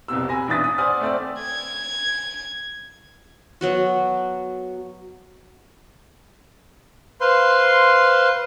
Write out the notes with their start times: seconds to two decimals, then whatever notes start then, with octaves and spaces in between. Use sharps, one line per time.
0.08 C2 F2 B2 E6
0.29 G#5 B5 A#6
0.48 B1 E3 D4 D#6 A6 B6
0.64 D#6
0.78 C5 D5 F#5 G#5 D#6 F6
1.01 A3 C4 D5 E6
1.41 G#6
3.61 F#3 B3 F#4
7.21 B4 C5 F5 C6